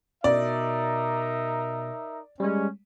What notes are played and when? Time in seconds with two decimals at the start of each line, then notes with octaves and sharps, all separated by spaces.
0.24 B2 D#4 A#4 D5 E5
2.40 G3 G#3 C#4